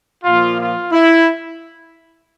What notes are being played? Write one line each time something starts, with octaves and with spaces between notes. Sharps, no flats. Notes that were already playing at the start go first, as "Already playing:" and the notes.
A#2 F3 A#3 F4
F4
E4